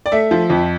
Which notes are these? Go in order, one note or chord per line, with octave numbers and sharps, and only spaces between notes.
D5
A3 E5
F3
F2